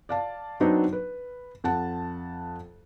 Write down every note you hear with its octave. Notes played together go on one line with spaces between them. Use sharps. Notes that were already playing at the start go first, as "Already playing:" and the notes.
D5 F5 A5
F#3 B3 C4 D4 D#4
B4
F2 F#5 A5